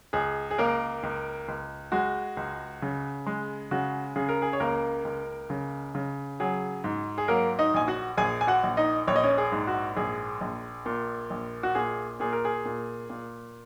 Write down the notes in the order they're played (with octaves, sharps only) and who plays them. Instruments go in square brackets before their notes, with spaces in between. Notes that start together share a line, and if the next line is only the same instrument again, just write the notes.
[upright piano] C#2 G#4
G#4
C#2 A#3 A#4
C#2
C#2
G#3 F#4
C#2
C#3
G#3
C#3 F#4
C#3 G#4
A#4
G#4
C#5
C#2 A#3 A#4
C#2
C#3
C#3
F#3 G#4
G#2
G#4
F#3 A#3 A#4
D#4 D#5
A#1 G#5
F#4 F#5
A#1 G#4 G#5
G#5
F#4 F#5
A#1
D#4 D#5
A#1 C#5
D#5
C#4 C#5
G#4
G#2
F#4
A#1 G#4
A#1
A#2
A#1
F#4
A#2 G#4
A#2 G#4
A#4
G#4
A#2
A#2